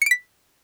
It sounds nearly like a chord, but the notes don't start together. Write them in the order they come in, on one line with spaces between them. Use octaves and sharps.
C#7 D7 B6